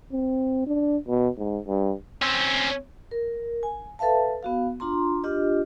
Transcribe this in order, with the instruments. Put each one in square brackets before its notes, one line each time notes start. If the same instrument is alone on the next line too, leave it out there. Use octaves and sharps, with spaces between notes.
[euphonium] C4
D4
B2
G#2
G2
[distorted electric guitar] C4 C#4
[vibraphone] A#4
G#5
A4 B4 E5 F5 A5
B3 F#4 F5
D4 F4 A#5 C6
D4 F4 G4 D#5